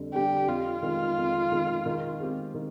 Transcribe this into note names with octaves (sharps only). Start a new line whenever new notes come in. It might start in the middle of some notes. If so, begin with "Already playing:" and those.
Already playing: F2 D3 G3 D4
D3 G3 D4 G4
F2 F4
D#3 G#3
F2
D#3 G#3
D#3
G#3 C4 G4
D#3